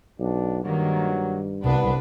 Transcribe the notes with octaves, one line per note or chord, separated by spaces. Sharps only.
B1 D4
G2 D#3 F#3 A#3
C2 B3 D4 B4